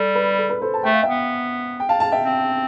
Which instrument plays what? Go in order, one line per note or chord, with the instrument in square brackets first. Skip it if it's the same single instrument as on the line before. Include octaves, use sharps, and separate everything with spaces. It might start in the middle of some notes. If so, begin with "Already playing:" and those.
Already playing: [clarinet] G3 [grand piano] A4
[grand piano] B4
A4
B4
A4 C5
A5
[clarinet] A3 [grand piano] G5
[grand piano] F5
E5 G5
[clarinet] B3
[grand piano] G5
F5 A5
F5 A5
E5 G5
[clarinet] C4